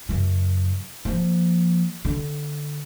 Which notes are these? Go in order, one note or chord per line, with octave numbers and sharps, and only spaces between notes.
F#2 C#3
F3 A#3
D3